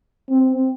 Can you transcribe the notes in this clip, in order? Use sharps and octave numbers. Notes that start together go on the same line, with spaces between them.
C4